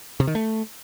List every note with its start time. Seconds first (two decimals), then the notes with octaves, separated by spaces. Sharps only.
0.20 C3
0.27 D#3
0.35 A3